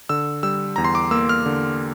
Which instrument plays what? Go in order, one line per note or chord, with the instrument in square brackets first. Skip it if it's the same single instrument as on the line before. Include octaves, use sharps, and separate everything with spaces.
[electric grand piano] D3 E6
G3 E6
E2 A#5
C6
D6
A#3 E6
F6
D3